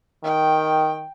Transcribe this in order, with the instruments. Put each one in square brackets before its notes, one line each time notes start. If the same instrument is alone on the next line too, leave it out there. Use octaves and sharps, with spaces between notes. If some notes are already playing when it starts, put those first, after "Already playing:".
[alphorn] D#3 [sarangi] G5